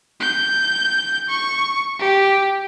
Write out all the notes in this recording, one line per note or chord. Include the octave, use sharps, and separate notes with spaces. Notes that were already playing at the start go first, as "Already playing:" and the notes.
G6
C#6
G4